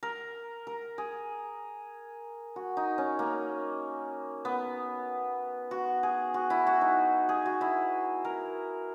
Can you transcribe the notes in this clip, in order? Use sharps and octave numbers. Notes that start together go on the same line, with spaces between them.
A#4
A#4
G#4
F#4
D#4
C#4
A#3
B3
F#4
G#4
F#4
E4
F#4
D#4
G#4
F#4
E4
A#4